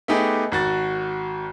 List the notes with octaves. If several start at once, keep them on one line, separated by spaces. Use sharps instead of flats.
A3 B3 D#4 G4 G#4 B4
G#1 F#4 A6